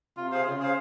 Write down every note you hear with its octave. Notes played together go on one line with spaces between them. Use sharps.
C3 F4
G#4 C5 F5
C#3 F4
G#4 C5 F5